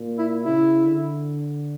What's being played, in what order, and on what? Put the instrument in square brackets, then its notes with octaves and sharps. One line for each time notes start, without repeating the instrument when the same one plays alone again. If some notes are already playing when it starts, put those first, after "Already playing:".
Already playing: [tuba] A#2
[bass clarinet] E4
[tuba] C#3 [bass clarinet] E4
[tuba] D3